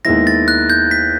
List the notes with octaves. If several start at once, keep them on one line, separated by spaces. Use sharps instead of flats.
D#2 D#3 G#3 B3 E4 A#6
A6
F#6
G6
B6